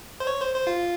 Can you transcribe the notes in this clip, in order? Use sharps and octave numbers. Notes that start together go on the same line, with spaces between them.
C5
C#5
C5
C5
F4